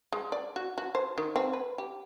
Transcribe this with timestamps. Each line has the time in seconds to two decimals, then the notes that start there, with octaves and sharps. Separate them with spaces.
0.12 G#3
0.32 D5
0.56 F#4
0.78 F#4
0.95 C5
1.18 D#3
1.36 C4
1.53 B4
1.78 G4